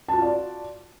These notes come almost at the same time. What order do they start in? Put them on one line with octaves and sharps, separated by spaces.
A5 F#4 F4 D5